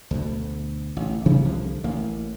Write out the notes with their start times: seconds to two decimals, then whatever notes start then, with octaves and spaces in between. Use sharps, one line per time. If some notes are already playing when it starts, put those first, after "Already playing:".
0.11 D2 B2
0.97 A1
1.26 C3 E3 G3 A3
1.45 C2 D3 F3
1.84 A1 A#3